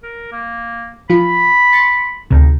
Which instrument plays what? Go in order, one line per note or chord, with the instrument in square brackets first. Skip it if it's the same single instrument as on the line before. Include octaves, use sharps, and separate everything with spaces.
[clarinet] A#4
A#3
[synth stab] F3 F4 [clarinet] B5
[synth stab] C6 A6 C#7
[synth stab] D2 C3 [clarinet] D#4